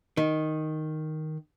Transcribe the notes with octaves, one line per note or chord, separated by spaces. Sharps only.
D#3